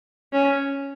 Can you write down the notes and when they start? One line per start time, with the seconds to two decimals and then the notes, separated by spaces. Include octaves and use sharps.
0.32 C#4